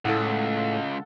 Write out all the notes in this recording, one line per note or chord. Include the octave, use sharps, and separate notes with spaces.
C#2 A2 A4 F5 F#5